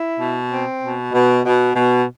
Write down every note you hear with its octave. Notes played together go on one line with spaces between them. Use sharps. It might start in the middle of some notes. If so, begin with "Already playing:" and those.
Already playing: E4
B2
C4
B2
B2
B2
B2